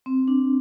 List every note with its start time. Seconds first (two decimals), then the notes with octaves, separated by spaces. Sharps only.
0.06 C4
0.28 D4